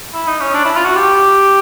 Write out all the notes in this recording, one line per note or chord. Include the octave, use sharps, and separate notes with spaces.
E4
D#4
C#4
D4
E4
F4
F#4
G4